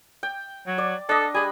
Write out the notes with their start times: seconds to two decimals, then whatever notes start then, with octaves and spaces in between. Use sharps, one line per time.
0.23 G5
0.67 F#3
0.78 D5
1.09 D4 A4 D#5
1.34 G3 G#4 B5